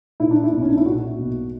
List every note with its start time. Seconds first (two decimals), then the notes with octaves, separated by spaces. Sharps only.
0.20 A#2 E4
0.31 D4
0.44 E4
0.52 B1
0.62 C#4
0.70 D4
0.77 E4
0.86 A#2 F#4
1.19 B1